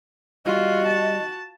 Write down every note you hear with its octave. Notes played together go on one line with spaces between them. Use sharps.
G3 F4 F#4 D#5
A5